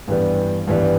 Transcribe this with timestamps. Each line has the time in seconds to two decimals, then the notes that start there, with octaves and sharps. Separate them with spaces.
0.08 G2 E3 G3 B3
0.67 G2 E3 G3 B3